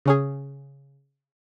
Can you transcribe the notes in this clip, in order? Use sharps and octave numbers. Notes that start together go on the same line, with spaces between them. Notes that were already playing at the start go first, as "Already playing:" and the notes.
C#3 C#4 G#4